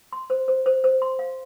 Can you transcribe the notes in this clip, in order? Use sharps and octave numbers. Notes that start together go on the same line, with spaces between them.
C6
C5
C5
C5
C5
C6
F5